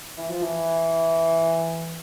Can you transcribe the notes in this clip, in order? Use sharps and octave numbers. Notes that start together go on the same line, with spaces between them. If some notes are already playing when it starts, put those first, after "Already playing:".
E3
F3
E3